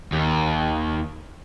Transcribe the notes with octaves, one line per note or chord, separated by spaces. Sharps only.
D#2